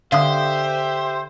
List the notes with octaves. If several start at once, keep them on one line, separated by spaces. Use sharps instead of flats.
D3 G4 C5 E5 F5 D#6